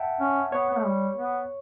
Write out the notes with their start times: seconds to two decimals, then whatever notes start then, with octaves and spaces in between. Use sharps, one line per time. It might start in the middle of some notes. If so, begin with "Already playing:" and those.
Already playing: E5 F#5 G5 A5
0.20 C#4
0.52 B3 C#5
0.69 B3
0.77 A3
0.85 G3
1.17 B3